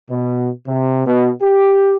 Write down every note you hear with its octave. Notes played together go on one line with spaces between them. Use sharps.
B2
C3
B2
G4